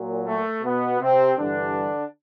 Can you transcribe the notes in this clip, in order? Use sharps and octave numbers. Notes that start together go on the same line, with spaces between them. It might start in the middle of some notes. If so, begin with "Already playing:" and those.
Already playing: A#2 F#3
A3
B2 B3
C3 C4
G2 D3 E3 G3 D4